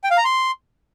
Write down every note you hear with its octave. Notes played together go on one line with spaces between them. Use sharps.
G5
F5
A#5
C6